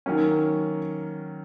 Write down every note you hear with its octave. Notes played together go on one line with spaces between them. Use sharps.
D#3 F#3 A#3 C#4